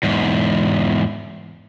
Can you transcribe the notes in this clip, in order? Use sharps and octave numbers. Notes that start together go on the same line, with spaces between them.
E2 G#2